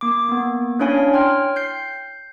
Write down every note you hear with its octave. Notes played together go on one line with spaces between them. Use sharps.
A#3 D6
A#3 B3
C#4 D4 E4 C#5 F5 G#5
C#5 G5 C6 F6
G6 C7